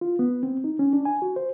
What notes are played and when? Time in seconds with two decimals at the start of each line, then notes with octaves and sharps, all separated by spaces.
0.01 F4
0.19 B3
0.43 C4
0.64 D#4
0.79 C#4
0.93 D4
1.05 G#5
1.22 F#4
1.36 C5